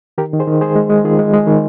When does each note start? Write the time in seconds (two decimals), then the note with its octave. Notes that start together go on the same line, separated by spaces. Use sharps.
0.18 D#3 G4 A#4
0.33 D#3
0.39 G#4 C5
0.47 D#3
0.61 G#3 G#4 C5
0.75 G#3
0.90 G#3
1.04 D#3 F4 G#4
1.19 G#3
1.33 G#3
1.47 D#3